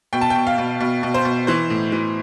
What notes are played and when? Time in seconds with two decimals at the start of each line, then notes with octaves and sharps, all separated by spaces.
0.13 B2 G5
0.21 A5
0.30 B2 G5
0.47 F5
0.58 B2
0.80 B2
1.03 B2
1.14 C5
1.25 B2
1.47 E3 C5
1.70 A2
1.92 E3